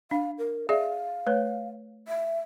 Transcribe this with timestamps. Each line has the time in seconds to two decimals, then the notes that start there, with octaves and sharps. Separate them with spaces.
0.11 D4 F5
0.38 A#4
0.69 G#4 D5 E5 F5
1.27 A3 B4 C#5
2.08 E5